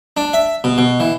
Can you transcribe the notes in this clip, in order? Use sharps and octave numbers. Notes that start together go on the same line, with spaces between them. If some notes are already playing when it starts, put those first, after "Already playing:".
D4
E5
B2
B2
E3